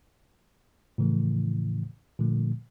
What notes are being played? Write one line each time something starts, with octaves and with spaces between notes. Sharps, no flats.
A2 C#3 E3 F3 A3
A#2 D3 F3 A3